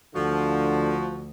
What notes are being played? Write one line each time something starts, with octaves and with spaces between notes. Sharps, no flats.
D2 D3 F3 F#4